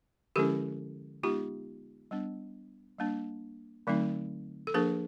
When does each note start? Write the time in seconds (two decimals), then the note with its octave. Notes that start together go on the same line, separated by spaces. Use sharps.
0.36 D3 F3 G#3 C#4 E4 G4 A4
1.23 G#3 B3 D#4 F4 G4
2.11 G3 B3 D4
2.98 G3 A#3 D4
3.87 D3 F#3 A3 C4 D#4
4.67 A4
4.74 F3 A#3 D4 G#4 A#4